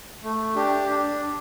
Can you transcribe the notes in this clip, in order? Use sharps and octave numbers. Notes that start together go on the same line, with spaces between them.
A3
D4 G4
D4